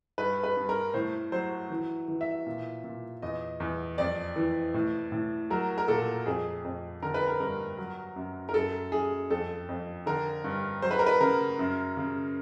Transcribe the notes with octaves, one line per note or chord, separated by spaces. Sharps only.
G2 B4
B4
G2
A#4
A2 C5
F#3 C5
E3
E3
E5
A#2
A#2
E2 D#5
E2
F2 D5
E3
A2
A2
F#3 A#4
A#4
A#2 A4
F2 G#4
F2
D3 A#4
B4
A#4
G2 A#4
F#3
F#2
A#4
F#2 A4
F#2 G#4
F2 A4
F2
D3 A#4
G2
F#3 C5
B4
A#4
B4
C#3 A#4
F#2
C#3